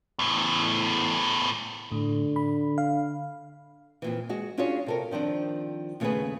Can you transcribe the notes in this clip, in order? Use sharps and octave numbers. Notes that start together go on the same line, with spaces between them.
E2 A2
A2 D3
B5
F5
F2 A#2 E3
G#3 F#4
C#4 D4 F4 F#4 G#4 C#5
C3 A4 A#4
D#3 F3 C4 D4
D#2 C#3 A3 B3 G#4 B4